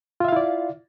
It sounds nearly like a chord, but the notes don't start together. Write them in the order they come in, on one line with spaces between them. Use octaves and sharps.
F4 E5 F5 E4 D5